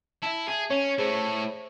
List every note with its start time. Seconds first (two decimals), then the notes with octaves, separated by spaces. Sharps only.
0.23 E4 E5 A5
0.49 G#4
0.71 C#4 C#5
0.98 A3 E4 G#4 C5